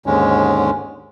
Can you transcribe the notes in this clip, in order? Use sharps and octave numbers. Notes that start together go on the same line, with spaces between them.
D#2 G#2 D3 G#3 C#4